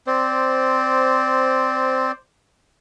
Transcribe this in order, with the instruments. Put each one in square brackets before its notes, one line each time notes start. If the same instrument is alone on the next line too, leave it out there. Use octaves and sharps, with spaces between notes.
[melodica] C4 [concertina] C5 D5